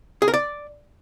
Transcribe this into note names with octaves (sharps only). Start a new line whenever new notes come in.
G#4
A#4
D5